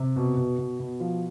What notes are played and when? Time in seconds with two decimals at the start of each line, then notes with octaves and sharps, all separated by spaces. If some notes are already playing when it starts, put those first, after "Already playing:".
Already playing: C3
0.16 B2
0.37 B2
0.58 B2
0.79 B2
1.00 F3